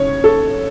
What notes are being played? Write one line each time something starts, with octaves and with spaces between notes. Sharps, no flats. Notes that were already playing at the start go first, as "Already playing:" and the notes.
Already playing: C#3 C#5
A4